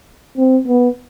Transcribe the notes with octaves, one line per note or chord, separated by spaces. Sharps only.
C4
B3